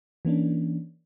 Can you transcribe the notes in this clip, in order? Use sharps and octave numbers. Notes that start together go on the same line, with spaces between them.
E3 A#3 C#4 D4